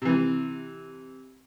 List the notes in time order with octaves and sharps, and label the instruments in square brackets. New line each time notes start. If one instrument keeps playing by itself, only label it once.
[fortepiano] C3 E3